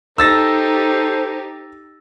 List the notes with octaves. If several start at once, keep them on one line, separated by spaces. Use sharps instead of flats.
D#4 G4 A4 C5 E6 A6 A#6